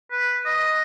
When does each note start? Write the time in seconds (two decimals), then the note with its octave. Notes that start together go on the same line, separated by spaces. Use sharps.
0.11 B4
0.46 D#5